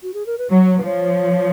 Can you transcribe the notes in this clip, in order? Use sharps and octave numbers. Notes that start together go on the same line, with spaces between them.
F#4
G#4
A#4
B4
F#3 C#5
B4
F3 C#5